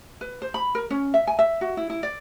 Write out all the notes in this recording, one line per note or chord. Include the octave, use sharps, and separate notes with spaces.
B4
C5
B5
A#4
C#4
E5
G#5
E5
F#4
E4
E4
D5